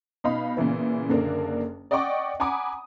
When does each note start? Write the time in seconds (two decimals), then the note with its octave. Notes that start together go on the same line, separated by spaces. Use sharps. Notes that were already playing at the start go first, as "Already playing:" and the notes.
0.24 B2 D#4 F5 B5
0.57 A#2 C#3 E3 B3
1.09 F#1 D3 A#3 D4
1.91 D5 D#5 F#5 G5 C#6 D6
2.40 F#5 G#5 A#5 B5 D6 D#6